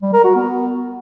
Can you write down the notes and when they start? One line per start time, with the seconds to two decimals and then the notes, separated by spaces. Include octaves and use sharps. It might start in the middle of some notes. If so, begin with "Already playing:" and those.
0.02 G3
0.13 A#4
0.24 F#4
0.35 B3